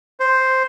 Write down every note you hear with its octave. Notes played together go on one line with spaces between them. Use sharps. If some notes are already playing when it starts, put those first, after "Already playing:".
C5